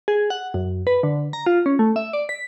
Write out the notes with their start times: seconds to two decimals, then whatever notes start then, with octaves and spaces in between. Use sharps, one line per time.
0.08 G#4
0.30 F#5
0.54 F#2
0.87 B4
1.03 D3
1.33 A#5
1.46 F4
1.66 C#4
1.79 A3
1.96 E5
2.13 D5
2.29 B6